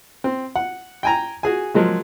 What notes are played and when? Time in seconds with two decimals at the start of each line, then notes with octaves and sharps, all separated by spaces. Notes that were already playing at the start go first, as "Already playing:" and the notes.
0.24 C4
0.56 F#5
1.03 G5 G#5 A#5
1.43 F#4 G#4 G#5
1.74 F3 F#3 G#3 A#3